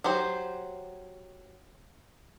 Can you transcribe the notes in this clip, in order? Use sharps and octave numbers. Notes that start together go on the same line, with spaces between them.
F#3 G4 C5